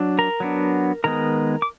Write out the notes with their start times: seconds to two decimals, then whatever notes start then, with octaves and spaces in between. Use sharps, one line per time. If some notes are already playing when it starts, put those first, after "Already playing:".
Already playing: F#3 D4
0.19 A#4 A#5
0.40 F#3 B3 D4
1.04 D#3 G#3 B3 A#4 A#5
1.62 D6